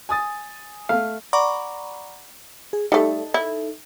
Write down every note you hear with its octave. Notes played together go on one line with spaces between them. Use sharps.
G#5 D#6 A6
A3 F5
D5 F#5 A#5 B5 C#6 D6
G#4
G3 A3 D#4 A4
E4